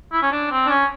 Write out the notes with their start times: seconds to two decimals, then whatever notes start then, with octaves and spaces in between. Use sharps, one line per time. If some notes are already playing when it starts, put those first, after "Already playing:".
0.13 E4
0.22 C#4
0.32 D4
0.51 C4
0.66 D4
0.69 C#4